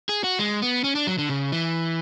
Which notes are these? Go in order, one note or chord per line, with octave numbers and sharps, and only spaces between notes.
G#4
F#4
G#3
B3
C#4
D4
F#3
D3
C#3
E3